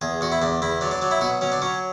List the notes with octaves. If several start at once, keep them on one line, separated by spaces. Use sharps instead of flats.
E2 G#4
E2 F#4
E4
E2 D4
E2 E4
F#3 D4
D4
F#3 D4
E4
B2 F#4
F#3 C#4
D4
F#3 C#4